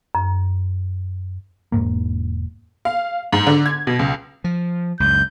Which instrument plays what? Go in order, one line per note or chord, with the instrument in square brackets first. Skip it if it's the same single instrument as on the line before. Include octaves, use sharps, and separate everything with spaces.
[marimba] F#2
[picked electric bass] E1 G#2 A#3
[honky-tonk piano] F5
G#2
D3
G#6
B2
C#2
[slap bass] F3
[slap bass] C#2 F#2 [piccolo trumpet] G6